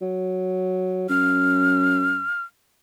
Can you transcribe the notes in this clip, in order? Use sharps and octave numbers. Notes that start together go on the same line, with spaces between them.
F#3
F#2 F6